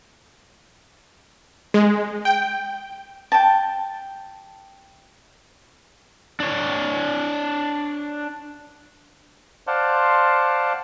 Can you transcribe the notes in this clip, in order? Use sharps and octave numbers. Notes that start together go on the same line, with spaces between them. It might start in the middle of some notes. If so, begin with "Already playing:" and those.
G#3
G5
G5 A5
D4 C#5
C5 D5 F5 F#5 A5 C6